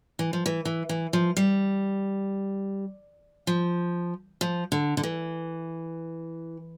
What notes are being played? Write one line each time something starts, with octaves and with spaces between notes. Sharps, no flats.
E3
F3
E3
E3
E3
F3
G3
F3
F3
D3
D3
E3